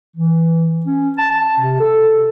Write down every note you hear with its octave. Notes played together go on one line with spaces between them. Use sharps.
E3
C#4
A5
A5
C3
A4